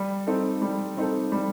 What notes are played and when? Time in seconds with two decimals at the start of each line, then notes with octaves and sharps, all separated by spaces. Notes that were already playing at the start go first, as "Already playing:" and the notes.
Already playing: G3
0.27 C4 D#4 A4
0.62 G3
0.97 C4 D#4 A4
1.32 G3